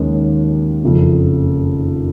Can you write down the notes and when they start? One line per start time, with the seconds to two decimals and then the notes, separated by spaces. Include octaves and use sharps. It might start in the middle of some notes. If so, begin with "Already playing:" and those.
Already playing: D#2 D#3 G#3 C#4
0.83 F#1 F2 C#3